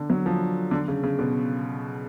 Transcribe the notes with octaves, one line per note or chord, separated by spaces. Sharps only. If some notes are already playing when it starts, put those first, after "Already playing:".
Already playing: D3
F#3
F3
D3
C#3
C#3
B2